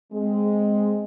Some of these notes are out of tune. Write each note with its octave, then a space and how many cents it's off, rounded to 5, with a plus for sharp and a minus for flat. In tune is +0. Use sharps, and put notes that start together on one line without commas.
G#3 +0 C4 +0